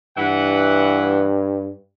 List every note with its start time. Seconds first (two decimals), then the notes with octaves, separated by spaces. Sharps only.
0.17 G2 E3 F#5